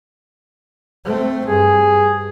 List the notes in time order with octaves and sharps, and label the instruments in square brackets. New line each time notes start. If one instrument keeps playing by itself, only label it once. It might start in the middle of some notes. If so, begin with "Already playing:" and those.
[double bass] A3 C4
[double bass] G2 [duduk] G#4